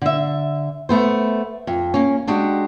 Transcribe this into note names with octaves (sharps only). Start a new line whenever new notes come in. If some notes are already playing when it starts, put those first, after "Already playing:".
D3 E5
A3 B3 C5
F2
A#3 C#4
G#3 D4 F#4 G4